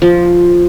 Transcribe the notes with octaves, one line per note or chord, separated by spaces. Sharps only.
F3